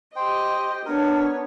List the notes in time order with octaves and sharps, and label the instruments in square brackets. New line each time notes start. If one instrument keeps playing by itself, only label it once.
[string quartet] G4 D#5 [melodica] C5 G5
[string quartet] B3 C#5 [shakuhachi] D4 [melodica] A#4